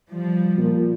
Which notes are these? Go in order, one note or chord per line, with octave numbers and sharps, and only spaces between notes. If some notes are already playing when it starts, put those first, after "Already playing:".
F3 G3
A#2